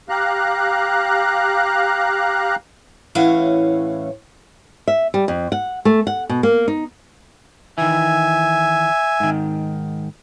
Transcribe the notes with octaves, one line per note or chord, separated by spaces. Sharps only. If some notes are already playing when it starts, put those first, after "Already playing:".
G4 F5 A#5 F#6
A2 E3 C#4 C#5 F5 F#5
E5
G3
F2
F#5
A3
F#5
B2
A#3
D#4
D#3 E3 E5 G#5
G#2 D#3